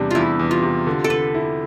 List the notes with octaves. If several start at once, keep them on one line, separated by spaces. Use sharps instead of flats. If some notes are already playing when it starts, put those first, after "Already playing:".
Already playing: E2 C3 G3 D4
E2 E4 F4
E2
F4
C3
D3
A4
D3 B4
E4